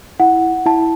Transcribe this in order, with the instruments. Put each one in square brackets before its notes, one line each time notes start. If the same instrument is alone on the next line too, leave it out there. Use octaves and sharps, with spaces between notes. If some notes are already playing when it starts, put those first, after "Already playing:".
[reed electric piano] E4 [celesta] F#5
[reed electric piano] E4 [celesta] A5